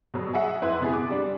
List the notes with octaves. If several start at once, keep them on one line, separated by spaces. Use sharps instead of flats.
B2 F#3 G3
G#4 D#5 E5 F#5
F2 E4 B4 C6 F#6
C3 B3 G#4
D6
G3 D4